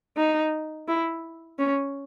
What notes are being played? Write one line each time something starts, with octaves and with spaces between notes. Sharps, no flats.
D#4
E4
C#4